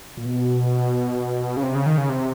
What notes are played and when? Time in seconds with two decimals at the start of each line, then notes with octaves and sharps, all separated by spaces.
0.17 A#2
0.26 B2
1.57 C#3
1.63 C3
1.75 C#3
1.86 D#3
1.98 C#3
2.09 C3